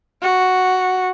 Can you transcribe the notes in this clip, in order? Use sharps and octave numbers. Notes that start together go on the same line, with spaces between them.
F#4